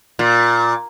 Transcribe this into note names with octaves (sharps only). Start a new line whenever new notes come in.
A#2